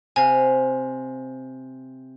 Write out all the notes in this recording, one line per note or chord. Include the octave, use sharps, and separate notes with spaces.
C3 F5 G#5